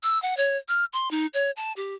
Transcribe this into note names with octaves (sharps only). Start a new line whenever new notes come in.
E6
F#5
C#5
F6
C6
D#4
C#5
A5
G4